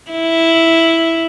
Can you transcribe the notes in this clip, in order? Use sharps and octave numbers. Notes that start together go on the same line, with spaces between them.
E4